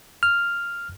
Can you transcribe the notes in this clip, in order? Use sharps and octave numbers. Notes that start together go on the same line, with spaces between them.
F6